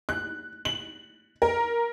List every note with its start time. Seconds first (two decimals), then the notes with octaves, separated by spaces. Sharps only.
0.09 F#6
0.65 F#7
1.42 A#4